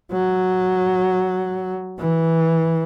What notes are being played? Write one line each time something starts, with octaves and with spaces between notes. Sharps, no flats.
F#3
E3